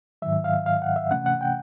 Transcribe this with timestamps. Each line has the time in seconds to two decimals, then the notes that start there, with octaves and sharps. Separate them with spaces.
0.22 G#2 D#3 F#3 E5
0.44 F5
0.66 F5
0.82 F#5
0.96 E5
1.11 C3 E3 A3 C#4 F#5
1.26 F#5
1.41 G5